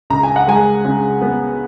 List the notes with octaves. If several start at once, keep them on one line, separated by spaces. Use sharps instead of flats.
C#2 A#5
G#5
F#5
G#3 G#5
C#3
B3